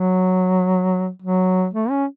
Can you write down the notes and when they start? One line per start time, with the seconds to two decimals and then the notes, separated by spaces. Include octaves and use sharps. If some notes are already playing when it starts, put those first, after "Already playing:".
Already playing: F#3
1.22 F#3
1.74 A3
1.90 C#4